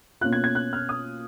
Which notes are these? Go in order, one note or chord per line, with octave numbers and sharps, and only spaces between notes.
B2 A#3 C#4 F4 F#6
G#6
G#6
F#6
F6
D#6